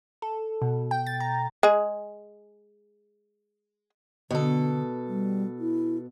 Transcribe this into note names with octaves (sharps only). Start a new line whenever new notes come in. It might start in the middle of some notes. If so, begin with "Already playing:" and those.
A4
B2
G5
A6
A#5
G#3 G#4
B2 D3 A4
G3
E4